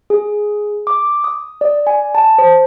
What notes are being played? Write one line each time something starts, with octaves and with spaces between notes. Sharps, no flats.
G#4
D6
D#6
D5
G#5
A5
C5